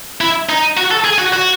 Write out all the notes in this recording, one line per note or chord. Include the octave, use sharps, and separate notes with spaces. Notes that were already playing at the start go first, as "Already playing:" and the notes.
E4
D#4
F#4
A4
G#4
F#4
F#4